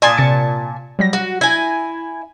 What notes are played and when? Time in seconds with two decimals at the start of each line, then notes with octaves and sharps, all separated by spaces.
0.02 A#2 D5 G#5 A5 C6 D#6
0.18 C3 A6 C#7
0.99 F#3 G3 A#6
1.13 F#4
1.41 E4 G#5 A#6